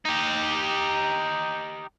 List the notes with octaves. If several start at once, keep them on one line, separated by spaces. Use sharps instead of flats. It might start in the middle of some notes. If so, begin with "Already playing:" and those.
D#4 G4